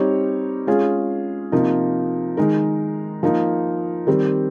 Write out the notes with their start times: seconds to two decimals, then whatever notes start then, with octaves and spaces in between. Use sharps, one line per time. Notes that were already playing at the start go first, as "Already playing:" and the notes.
Already playing: G3 C4 D#4 G4 C#5
0.67 G#3 C#4 F4 G#4
1.52 C3 F3 A#3 D#4
2.37 D#3 G#3 D#4 A#4
3.23 F3 A#3 D#4
4.07 D#3 G3 C4 G4